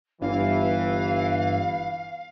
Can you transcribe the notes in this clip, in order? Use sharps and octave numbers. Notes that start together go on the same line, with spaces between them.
G1 G2 E3 F5